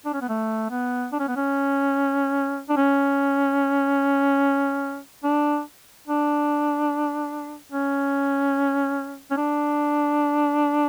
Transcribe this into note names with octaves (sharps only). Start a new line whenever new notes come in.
D4
C#4
B3
A3
B3
D4
C#4
B3
C#4
D4
C#4
D4
D4
C#4
C#4
D4